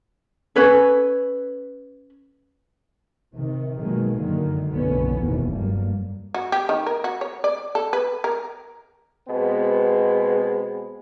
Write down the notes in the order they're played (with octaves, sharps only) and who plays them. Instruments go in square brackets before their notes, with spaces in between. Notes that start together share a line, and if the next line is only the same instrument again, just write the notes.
[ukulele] C#4 A4 B4 C#5
[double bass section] C3 D#3
B2 D#3 F3 F#3 G#3 A#3
F#2 D3 D#3 F#3 A#3
F#1 B1 A2 D3 B3 C#4
F1 D#2 B2 E3
G2 F#3 G3 A#3
[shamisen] F#4
G4
D#3
A#4
F#4
C#5
D5
A4
B4
A#4
[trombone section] B2 G#3 B3 C4